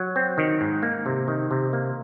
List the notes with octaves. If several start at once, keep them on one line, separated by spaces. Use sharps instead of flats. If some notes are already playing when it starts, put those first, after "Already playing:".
Already playing: F#3
C4
D#3
G#2
A#3
C3
D#3
C3
A#3